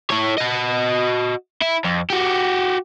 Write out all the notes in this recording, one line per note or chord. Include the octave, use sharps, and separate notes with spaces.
E4 C#5
F#4 D#5
E4
F2
F#4 G4